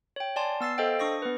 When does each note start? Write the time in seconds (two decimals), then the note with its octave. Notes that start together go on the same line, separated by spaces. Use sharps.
0.16 C#5 G5
0.36 D5 G#5 A5 C6
0.61 B3 E6 A6 C7
0.78 A4 C5 D#5 F5 G5
0.99 D4 C#6 D#6 A#6
1.22 B3 B4